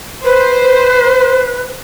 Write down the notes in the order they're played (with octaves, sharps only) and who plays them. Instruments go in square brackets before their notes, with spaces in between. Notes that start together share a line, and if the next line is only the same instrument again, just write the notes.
[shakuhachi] B4 [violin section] C5